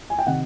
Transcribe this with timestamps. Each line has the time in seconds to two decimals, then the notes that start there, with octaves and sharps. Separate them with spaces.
0.10 G#5
0.19 G5
0.27 C3 D#3 F#5